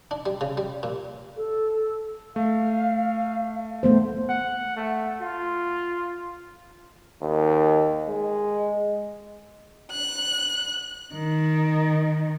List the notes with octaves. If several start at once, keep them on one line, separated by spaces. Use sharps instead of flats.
D4
G3
C#3
G3
A#2
A4
A3 F5
A3 B3 C5
F#5
A3
F4
D#2
G#3
F#6
D#3